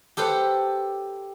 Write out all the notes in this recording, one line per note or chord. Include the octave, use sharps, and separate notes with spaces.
G4 A4 B4 C5 F#5